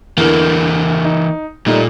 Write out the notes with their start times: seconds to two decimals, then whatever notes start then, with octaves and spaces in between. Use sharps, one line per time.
0.18 E2 D3 E3 A#3 A#4
1.05 D#4
1.66 A#2 G3 A3 D#4